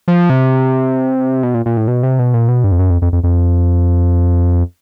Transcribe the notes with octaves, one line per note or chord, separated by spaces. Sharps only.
F3
C3
B2
A#2
A#2
A2
B2
C3
B2
A#2
B2
G2
F2
F#2
F2
F2
F2
F2